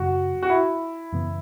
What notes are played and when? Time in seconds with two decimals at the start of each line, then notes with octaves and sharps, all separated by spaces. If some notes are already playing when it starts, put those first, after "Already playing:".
Already playing: F#1 F#2 C#3 F#3 F#4
0.43 F#4
0.50 E4
1.12 F#2 C#3 E3 B3